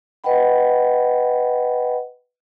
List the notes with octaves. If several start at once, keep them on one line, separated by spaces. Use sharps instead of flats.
B4 D#5 F#5 G5 B5